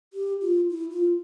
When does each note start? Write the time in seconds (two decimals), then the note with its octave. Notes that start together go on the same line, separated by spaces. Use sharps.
0.13 G4
0.41 F4
0.70 E4
0.91 F4